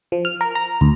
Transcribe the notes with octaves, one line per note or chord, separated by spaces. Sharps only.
F3
F6
A#4
A#5
D2